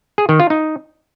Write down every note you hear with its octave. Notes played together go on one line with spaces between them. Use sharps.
G#4
D#3
F4
D#4